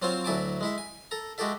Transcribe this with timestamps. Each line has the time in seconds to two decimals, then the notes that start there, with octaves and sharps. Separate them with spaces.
0.02 F#3 C4 F4 C5 C#5 F5
0.25 D2 F#3 E4 G#5 A5 D6
0.61 G#3 E4 E5
0.78 G#5
1.11 A4 A#5
1.38 G#3 F#4 G4 A4 E5